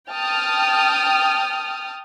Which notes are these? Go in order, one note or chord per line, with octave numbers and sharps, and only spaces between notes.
G5 A5 D#6 F6